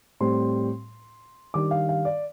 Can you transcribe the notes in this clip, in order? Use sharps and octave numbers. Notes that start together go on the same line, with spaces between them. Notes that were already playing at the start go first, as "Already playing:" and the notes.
A2 G3 C4 C6
D#3 G3 D4 D6
F5
F5
D5